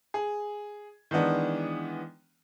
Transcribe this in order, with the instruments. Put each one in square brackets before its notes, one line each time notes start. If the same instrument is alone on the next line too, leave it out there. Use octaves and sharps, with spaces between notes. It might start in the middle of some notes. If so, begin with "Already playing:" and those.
[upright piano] G#4
D#3 E3 G#3 B3 D4